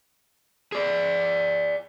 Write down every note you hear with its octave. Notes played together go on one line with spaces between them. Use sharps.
G#4 D5